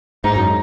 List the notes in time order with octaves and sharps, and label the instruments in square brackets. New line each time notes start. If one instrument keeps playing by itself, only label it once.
[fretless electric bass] G#2 [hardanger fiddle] D#4
[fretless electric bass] F#2